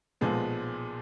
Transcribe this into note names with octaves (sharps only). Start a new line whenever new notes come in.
B1 A#2 F3 G#3 B3